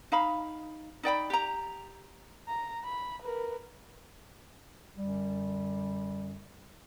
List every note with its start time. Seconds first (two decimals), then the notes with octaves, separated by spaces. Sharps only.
0.12 D#4 F5 B5
1.03 D#4 D5 G5 B5
1.30 G4 A#5
2.48 A#5
2.85 B5
3.22 A#4 B4
4.97 F#2 D3 G3